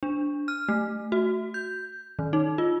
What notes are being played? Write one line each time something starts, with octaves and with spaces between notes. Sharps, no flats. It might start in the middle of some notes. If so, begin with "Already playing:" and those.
D4
F6
A3
F#4
G6
D#3
D#4
F4